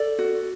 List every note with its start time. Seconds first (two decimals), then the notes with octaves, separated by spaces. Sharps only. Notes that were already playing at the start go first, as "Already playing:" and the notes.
Already playing: A4 D5
0.19 F#4